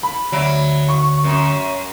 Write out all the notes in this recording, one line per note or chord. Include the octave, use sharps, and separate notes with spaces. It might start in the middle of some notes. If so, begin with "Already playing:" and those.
B5
D2 F#3 D5 E5
C#6
F#2